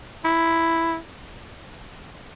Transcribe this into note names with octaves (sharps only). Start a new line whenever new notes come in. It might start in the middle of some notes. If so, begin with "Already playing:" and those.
E4